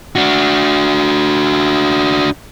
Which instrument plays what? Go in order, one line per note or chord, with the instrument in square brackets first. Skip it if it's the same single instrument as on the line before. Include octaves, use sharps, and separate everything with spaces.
[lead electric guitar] D4 F#4